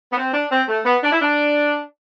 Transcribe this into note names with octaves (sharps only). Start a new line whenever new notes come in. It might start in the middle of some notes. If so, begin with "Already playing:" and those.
B3
C4
D4
C4
A3
B3
D4
E4
D4